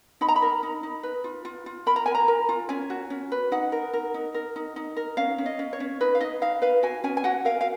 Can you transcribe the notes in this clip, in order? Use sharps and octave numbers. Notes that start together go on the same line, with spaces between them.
D#4 B5
A#5
B5
A#4
D#4
D#4
B4
F4
F4
F4
A#4 B5
A#5
A#4 G#5
A#5
A#4
F4
C#4 G#5
F#4
C#4
B4
D#4 F#5
A#4
A#4
D#4
A#4
D#4
D#4
A#4
C#4 F5
C#4
D#5
C#4
C#5
C#4
D#4 B4
F5
D#4 D#5
D#4 F5
B4 F5
F#4 G#5
C#4 G#5
G#5
F#4 F#5
A#4 F5
F5